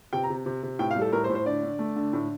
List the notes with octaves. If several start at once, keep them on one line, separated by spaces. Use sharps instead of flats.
C3 G5
A#5
C3
C3
C3
A2 G5
F5
G3
A4
A2 A#4
C5
A2
C5
D3 D5
D3
A3
D3
A2